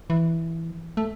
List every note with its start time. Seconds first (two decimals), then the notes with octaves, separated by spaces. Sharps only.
0.10 E3
0.97 A3